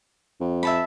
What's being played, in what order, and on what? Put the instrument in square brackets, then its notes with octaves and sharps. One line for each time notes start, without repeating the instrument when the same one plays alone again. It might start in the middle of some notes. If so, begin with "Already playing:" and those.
[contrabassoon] F2
[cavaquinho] E5 A5 B5